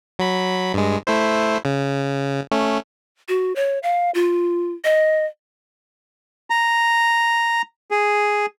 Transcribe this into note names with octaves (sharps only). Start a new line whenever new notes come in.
F#3 B5
G2 G#3
A3 E4 C5
C#3
A3 C#4
F#4
C#5
F5
F4
D#5
A#5
G#4